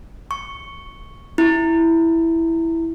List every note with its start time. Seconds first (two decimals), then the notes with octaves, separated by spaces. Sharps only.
0.31 C#6
1.38 E4